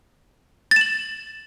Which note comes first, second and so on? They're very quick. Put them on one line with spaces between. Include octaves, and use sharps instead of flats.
A6 E7 F#7